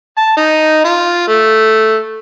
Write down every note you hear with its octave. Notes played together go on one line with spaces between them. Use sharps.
A5
D#4
F4
A3